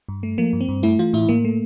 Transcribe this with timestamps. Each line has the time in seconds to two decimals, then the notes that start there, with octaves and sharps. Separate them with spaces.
0.09 G2
0.23 A3
0.38 F3 A#3
0.53 G2
0.61 C4
0.69 G2
0.83 A3 E4
0.99 E3 F4
1.13 A2 E4
1.29 A2 A#3
1.45 A3